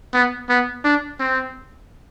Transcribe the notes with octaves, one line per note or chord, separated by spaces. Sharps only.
B3
B3
D4
C4